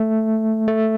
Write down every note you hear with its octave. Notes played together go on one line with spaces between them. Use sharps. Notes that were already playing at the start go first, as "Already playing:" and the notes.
Already playing: A3
A3